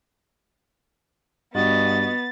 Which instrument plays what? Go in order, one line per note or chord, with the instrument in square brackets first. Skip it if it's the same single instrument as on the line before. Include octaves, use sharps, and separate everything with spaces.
[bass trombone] G2 [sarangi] B3 [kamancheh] F#4 D#5 [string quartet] A6